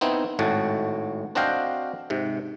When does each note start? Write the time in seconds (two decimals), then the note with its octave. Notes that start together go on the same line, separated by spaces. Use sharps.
0.01 B3 C4 D#4 E4
0.39 G#1 A2 F#4 A5
1.35 C4 D4 F#4 D#5 F5 G5
2.10 G#2 C3